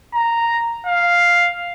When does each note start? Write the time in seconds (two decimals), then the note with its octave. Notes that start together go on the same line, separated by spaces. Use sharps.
0.14 A#5
0.87 F5